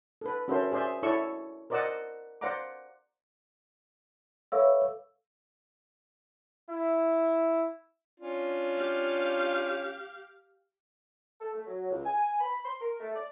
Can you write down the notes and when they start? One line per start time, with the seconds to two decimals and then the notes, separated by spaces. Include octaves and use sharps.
0.21 A4 B4
0.48 C#4 F#4 A4 A#4 C5 E5
0.72 G#4 C5 D5 E5
1.03 E4 A4 C#5 D5 C#6 E6
1.70 A#4 C5 D5 D#5 F#5 E6
2.41 C5 D5 F5 F#5 A#5 D6
4.52 A4 B4 C#5 E5 F5 E6
6.69 E4
8.20 C#4 D4 F4
8.77 G4 F5
11.41 A4
11.53 A3
11.66 F#3
11.91 C#2
12.05 G#5
12.41 B5
12.65 C6
12.81 A#4
13.00 A3
13.15 D5